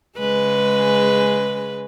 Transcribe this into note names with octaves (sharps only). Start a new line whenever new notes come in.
C#3 G#3 B4